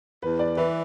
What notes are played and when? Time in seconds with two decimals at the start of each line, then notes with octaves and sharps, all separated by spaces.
0.22 E2 B4
0.39 D5
0.57 E3 B4